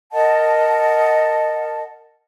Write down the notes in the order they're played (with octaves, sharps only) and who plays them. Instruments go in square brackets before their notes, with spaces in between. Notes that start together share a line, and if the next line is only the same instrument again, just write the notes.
[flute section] A#4 D#5 F#5 A5